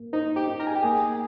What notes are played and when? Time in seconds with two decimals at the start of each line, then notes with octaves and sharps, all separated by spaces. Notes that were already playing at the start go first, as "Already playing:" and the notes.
Already playing: A#3
0.13 D#4 C5
0.36 G4
0.47 D#4
0.60 A#4
0.67 G#4
0.75 G4
0.83 A#3 G#4